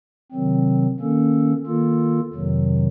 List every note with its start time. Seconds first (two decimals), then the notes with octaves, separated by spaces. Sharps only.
0.32 C3 D#3 F#3 C4
1.00 D#3 A#3 C#4 A4
1.66 D#3 A#3 F4 A4
2.34 F2 C3 D#3 F#3